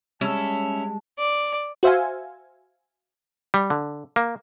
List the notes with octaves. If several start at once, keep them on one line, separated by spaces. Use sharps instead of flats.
G3 G#3 C#4 E4 A5
D5
F#4 C5 E5 F5 G#5
G3
D3
A#3